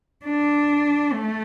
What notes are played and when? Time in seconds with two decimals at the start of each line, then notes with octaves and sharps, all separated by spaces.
0.25 D4
1.13 A3